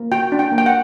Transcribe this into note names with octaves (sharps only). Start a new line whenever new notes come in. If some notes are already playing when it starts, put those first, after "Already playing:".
Already playing: A#3
F#4 G5
D4
G5
A#3
G5
F#5